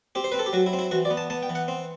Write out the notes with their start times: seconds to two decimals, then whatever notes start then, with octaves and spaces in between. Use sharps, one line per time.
0.15 C4 G4
0.24 C5
0.32 C4 B4
0.39 A4
0.46 G4
0.53 F#3 F#4
0.66 E4
0.73 C4
0.79 E4
0.91 E3 F#4
1.05 D5
1.11 B3
1.17 A5
1.30 B3 A5
1.43 G5
1.50 E3
1.55 F#5
1.68 C4